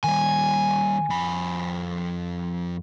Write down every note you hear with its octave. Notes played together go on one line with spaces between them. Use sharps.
D#3 G3 G#5
F2 B5